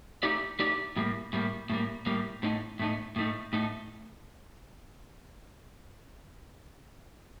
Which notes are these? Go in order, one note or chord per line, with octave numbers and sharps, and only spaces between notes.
A3 D#4 G4 D5
A3 D#4 G4 D5
A2 G3 A#3
A2 G3 A#3
A2 G3 A#3
A2 G3 A#3
A2 A3 D#4
A2 A3 D#4
A2 A3 D#4
A2 A3 D#4